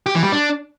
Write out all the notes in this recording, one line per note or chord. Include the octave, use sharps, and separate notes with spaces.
G4
E3
G3
D4